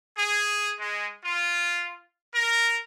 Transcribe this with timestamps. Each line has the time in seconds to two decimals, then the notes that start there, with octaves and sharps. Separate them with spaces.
0.15 G#4
0.79 G#3
1.22 F4
2.33 A#4